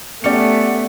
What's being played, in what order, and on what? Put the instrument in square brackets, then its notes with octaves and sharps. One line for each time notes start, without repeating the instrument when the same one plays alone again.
[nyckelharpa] A3 [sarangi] B3 [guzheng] C#4 G4 [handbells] D5 C#7